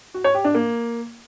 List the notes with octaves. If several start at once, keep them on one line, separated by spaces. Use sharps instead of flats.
F#4
C#5
G4
D4
A#3